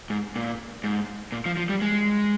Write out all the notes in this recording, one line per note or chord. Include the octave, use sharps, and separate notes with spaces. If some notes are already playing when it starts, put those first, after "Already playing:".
G#2
A#2
G#2
A#2
F3
F3
G3
G#3